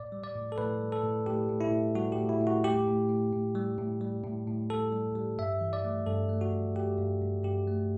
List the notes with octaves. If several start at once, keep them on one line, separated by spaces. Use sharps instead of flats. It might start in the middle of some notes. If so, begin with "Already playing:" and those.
Already playing: A2 D5
G3
D5
A2
A4
A2 B4
G3
A4
A2
A2 G4
A2
E4
A2
G3 F#4
G4
A2
E4
A2
F#4
A2 G4
A2
A2
A2
G3
A2
G3
A2
A2
A2 A4
G3
G3
G2 E5
E3
D5
A3
G2 A4
A3
F#4
G2
A3 G4
G2
G2
G2 G4
A3